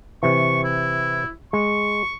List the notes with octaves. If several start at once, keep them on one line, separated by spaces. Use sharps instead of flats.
C3 E3 C#6
E4
G#3 C#6